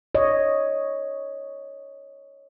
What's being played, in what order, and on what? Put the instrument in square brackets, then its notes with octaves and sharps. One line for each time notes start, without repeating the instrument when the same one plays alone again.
[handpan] C#5 D#5